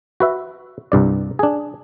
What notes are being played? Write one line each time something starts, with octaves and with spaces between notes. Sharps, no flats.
F#4 B4 E5
C2 G2 D5
D4 G#4